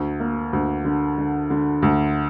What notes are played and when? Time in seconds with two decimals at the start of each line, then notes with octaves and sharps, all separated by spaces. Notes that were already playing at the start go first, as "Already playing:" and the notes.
Already playing: D2
0.20 A#3
0.53 D2
0.84 D3
1.18 D3
1.50 D3
1.82 D2